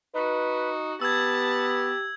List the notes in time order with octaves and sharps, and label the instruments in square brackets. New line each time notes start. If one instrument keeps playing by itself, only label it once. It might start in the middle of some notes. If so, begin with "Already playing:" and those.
[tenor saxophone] D#4 [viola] F#4 [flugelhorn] B4
[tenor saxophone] B3 [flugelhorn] G4 [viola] A5 [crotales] E6 G#6